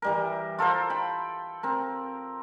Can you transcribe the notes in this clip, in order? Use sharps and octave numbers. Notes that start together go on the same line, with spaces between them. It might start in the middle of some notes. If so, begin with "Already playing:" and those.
E3 G3 A#4
F4 A4 A#4 C5
G5 B5
C4 A#4